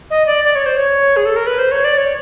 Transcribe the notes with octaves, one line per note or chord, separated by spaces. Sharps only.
D#5
D5
D5
C#5
C5
C#5
G#4
A4
A#4
B4
C5
C#5
D5
C#5